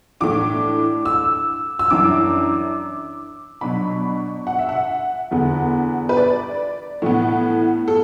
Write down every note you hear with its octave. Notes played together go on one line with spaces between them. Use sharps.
A2 E3 D4 D6
E6
E6
F#2 E3 D4 D6
B2 F#3 D4 B5
F#5
E5
F#5
E2 D3 B3
B4
D5
A2 E3 B3
A4